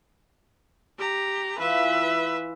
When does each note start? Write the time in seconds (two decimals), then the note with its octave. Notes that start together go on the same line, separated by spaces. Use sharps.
0.98 G4 A#5
1.58 E3 F4 B4 E5